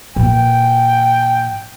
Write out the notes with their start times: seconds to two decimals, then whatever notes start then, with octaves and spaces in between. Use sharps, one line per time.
0.16 A#2 E3 G5